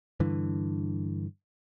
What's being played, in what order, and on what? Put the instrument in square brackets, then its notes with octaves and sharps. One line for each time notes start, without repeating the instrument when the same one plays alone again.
[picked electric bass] G2 D3 E3